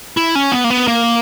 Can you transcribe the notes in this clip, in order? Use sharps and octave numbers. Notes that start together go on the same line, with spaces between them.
E4
C#4
B3
A#3
B3
A#3